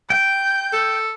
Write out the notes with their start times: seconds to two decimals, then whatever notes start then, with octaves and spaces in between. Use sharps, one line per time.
0.10 G5 G6
0.73 A4